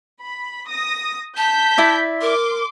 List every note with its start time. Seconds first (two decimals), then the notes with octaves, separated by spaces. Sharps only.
0.21 B5
0.68 D#6 A#6
1.37 A5 G6 B6
1.78 E4 D5 E5
2.21 A#4 C6 D6